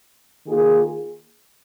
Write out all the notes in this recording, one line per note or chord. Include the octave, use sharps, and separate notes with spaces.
D#3 A#3 F4 G#4